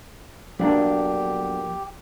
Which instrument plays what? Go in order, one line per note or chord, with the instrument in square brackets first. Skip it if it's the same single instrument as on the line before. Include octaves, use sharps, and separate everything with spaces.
[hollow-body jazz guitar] B1 D4 [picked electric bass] F3 A#3 [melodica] G4